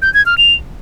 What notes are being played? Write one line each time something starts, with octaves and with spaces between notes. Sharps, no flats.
G6
G#6
F6
F7